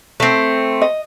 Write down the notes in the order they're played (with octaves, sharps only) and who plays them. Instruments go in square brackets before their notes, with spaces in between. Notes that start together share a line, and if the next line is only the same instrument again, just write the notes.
[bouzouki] A3 C4
[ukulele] D#5